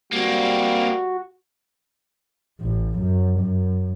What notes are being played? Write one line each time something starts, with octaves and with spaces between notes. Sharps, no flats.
G3 A#3 C4 F#4
A1
F#2
F#2